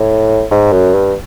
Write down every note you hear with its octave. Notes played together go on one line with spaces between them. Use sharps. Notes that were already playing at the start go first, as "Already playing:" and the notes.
Already playing: A2
G#2
F#2
G2